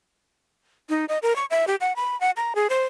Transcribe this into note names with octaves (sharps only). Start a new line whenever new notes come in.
D#4
D#5
A#4
C#6
E5
G4
F#5
B5
F#5
A#5
G#4
C5